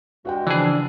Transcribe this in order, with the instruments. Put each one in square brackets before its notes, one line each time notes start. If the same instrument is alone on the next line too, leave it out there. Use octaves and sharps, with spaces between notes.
[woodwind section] G2 G#3 [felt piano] F#4 F#5 G5
[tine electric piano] C#3 F3 [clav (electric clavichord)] E3 G#4 [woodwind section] D4